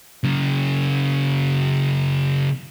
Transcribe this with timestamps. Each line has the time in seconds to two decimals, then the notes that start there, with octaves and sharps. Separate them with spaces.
0.24 C#3 F#3